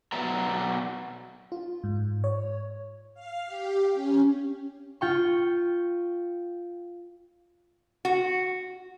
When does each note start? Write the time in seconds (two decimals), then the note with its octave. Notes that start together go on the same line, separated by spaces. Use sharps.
0.12 B2 F#3 B3 D5 E5 A#5
1.52 F4
1.84 G#2
2.24 C#5
3.14 F5
3.47 G4
3.93 C#4
5.01 F4 G5 C#6
8.05 F#4